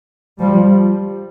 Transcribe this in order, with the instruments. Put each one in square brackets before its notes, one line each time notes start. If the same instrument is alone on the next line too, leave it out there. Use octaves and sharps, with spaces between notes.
[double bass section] F3 G3